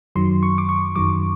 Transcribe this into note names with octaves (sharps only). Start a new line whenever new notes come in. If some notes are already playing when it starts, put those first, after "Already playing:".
F#2 D#3 F#3 C6
C#6
D6
C#6
F#2 D#3 F#3 D6